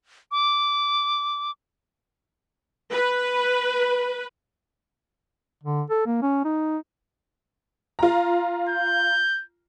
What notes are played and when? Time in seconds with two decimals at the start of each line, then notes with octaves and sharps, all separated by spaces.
0.31 D6
2.92 B4
5.63 D3
5.90 A4
6.06 A#3
6.22 C#4
6.45 D#4
7.99 F4 A#5
8.69 G6